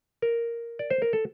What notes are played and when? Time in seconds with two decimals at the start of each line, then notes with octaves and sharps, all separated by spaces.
0.22 A#4
0.79 D5
0.90 C5
1.02 A#4
1.13 A4